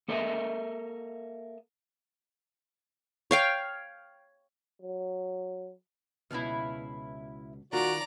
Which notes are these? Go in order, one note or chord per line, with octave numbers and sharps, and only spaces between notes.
A#3 A4 A#4 D#5 E5
C#5 F5 G5
F#3
C#2 B2 B3 E4 F5
D#3 F4 F#4 A#4 D5 A#5